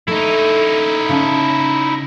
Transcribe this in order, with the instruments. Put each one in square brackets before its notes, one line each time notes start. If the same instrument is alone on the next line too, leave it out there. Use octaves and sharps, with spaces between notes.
[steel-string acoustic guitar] A3 [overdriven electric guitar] D#4 E4
[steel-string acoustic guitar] C#3 A5